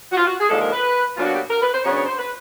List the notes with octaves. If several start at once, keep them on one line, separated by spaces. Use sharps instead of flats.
F#4
F4
F#4
G#4
D#2 D3 F3 G#3 A4
A#4
B4
B2 F#3 A#3 D4 F4
F#4
G4
A#4
B4
C5
C#3 F#3 B3 D4 C#5
C#5
C5
B4